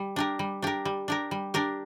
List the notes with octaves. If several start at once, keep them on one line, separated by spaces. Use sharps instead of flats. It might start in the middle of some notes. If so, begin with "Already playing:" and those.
Already playing: G3
D4 G4 A#4
G3
D4 G4 A#4
G3
D4 G4 A#4
G3
D4 G4 A#4